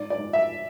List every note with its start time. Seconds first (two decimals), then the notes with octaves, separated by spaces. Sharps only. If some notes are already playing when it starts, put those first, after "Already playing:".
Already playing: G#2 D5
0.10 D5
0.18 G#2
0.33 E5